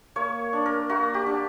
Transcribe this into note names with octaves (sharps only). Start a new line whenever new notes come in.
A#3 C#5
D4
A#4
A#3 F#4
G4
D4